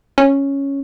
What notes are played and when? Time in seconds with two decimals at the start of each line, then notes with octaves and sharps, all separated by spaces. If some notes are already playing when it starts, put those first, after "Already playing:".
0.18 C#4